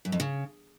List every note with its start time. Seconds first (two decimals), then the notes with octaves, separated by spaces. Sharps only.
0.05 F#2
0.12 F2
0.20 C#3